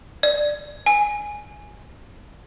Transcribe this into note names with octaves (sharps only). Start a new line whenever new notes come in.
D5
G#5